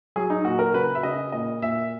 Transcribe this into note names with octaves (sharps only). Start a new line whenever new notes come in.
F#3 G#4
D#4
A#2 F#4
A#4
C#3 B4
E5
C#3 D#5
A#2 D#5
A#2 E5